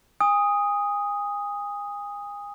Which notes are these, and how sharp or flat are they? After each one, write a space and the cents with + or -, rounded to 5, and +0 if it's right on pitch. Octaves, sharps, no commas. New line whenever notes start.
G#5 -35 D#6 +0